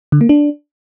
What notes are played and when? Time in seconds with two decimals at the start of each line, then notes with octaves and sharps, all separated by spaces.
0.12 D3
0.21 A#3
0.29 D4